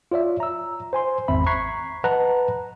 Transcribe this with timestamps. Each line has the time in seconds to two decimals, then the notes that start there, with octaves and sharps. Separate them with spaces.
0.11 F4 C#5 D5 E5
0.40 A#5 E6
0.93 C5 G#5 C6
1.28 G#1 E2 C4 E5 B5
1.46 A#5 C#6 F#6 G#6 B6 C7
2.04 B4 D#5 F#5 A5 A#5 F#6